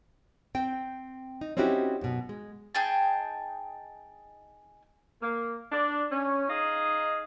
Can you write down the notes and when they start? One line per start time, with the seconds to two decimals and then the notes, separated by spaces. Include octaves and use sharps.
0.55 C4 G5
1.41 D#4
1.57 C4 C#4 D#4 E4 F#4 G4
2.01 F#2 B2
2.29 G#3
2.75 D#4 G#4 G5 A5
5.21 A#3
5.72 D4
6.11 C#4
6.48 D#4 G#4 D#5 F5